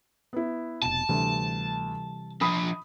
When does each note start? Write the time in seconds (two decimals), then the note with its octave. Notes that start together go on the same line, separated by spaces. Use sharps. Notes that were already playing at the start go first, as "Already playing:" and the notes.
0.33 B3 E4
0.82 F1 B2 A5
1.09 D2 C3 E3 G3
2.41 F3 D4 B5 D#6